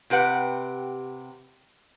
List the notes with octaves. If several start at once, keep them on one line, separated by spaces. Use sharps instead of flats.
C3 G4 B4 F#5